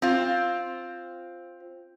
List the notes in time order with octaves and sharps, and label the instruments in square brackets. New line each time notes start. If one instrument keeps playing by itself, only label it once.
[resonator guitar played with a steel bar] C4 F4